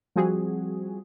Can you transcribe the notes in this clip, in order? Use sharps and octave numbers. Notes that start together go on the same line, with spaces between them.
F3 G3 C4 F#4 G#4